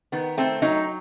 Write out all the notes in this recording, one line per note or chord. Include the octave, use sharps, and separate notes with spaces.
D#3 B3
A3 C4
F#3 D#4